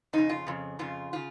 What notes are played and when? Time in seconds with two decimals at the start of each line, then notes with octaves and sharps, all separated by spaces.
0.13 F2 C#3 D#4
0.29 F4
0.47 F2 C#3
0.79 F2 C#3 F4
1.13 C#3 F4